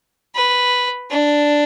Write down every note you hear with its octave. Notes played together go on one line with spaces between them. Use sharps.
B4
D4